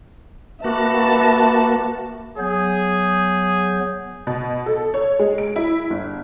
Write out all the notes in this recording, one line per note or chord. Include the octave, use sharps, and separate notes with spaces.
A#3 F#4 B4 E5 A5
F#3 B3 G#4 G6
B2
A4
C#5
G#3
D7
E4
G1